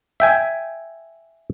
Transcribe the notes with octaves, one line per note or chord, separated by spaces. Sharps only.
E5 G5 G#5